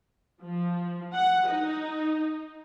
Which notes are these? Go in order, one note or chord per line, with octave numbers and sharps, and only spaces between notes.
F3
F#5
D#4